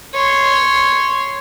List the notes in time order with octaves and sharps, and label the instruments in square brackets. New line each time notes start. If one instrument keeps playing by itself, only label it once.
[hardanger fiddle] C#5 C6